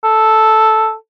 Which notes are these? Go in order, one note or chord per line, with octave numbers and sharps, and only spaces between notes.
A4